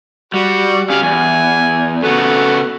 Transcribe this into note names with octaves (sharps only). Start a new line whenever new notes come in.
G3 F#4
G3 C#4 G#4 F5
E2 G#5
C#3 A3 B3 F#4